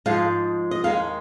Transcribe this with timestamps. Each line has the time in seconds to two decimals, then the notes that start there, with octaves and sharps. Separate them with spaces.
0.06 G#2 F3 G#3 F5
0.71 D#5
0.84 D#2 D#3 G#3 F5